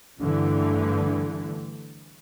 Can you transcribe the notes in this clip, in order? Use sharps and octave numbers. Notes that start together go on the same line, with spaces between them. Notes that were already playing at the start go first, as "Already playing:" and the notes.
G2 D3 E3 A3